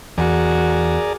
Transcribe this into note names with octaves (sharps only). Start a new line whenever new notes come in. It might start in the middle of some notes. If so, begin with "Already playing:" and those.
E2 F#4 G#4 A#4 D5